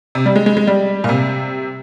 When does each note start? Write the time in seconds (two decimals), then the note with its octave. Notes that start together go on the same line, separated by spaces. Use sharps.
0.15 C3
0.26 G3
0.35 G#3
0.46 G#3
0.57 G#3
0.67 G3
1.04 A#2
1.09 C3